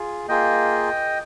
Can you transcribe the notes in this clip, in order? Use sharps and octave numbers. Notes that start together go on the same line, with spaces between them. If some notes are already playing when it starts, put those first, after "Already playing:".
Already playing: F4 G#4
A#3 F4 G#4 D#5 G5